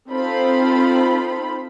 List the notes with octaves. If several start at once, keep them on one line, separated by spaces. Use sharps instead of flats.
C4 D#4 F4 A4 C5 B5